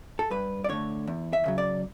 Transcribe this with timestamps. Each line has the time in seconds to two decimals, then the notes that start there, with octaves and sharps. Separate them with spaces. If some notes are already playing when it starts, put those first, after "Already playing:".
0.19 A4
0.31 G2 B4
0.64 D5
0.69 D3 A3 C#5
1.07 E2
1.33 E5
1.46 C#3 F#3
1.58 D5